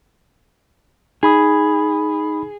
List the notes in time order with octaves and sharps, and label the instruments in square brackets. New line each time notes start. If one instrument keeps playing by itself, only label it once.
[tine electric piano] D#4 B5 D#6 [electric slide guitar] G#4